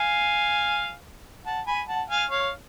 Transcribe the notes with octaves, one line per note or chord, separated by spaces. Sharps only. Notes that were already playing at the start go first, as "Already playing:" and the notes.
Already playing: F5 G#5
F#5 A5
G#5 B5
F#5 A5
F5 G#5
C#5 F5